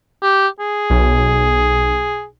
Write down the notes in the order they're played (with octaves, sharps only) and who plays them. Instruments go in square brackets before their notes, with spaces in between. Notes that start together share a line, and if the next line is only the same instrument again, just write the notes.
[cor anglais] G4
G#4
[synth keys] B1